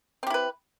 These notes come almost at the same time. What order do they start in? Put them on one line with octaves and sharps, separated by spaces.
C4 G4 E4 B4